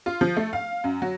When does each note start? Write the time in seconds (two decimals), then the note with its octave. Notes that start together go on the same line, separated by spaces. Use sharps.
0.06 F4
0.21 F3
0.37 A3
0.53 F5
0.84 F#2
1.02 F#3